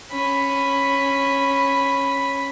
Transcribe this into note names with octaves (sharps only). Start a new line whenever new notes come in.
C#4 B5